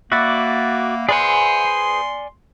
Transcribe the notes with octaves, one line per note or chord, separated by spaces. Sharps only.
A#3 F#4 D5 E5 F#5 B5
G#4 B4 C5 D5 G#5 C6